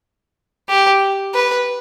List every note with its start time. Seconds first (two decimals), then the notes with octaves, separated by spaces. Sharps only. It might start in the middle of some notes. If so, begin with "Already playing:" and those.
0.69 G4
1.34 B4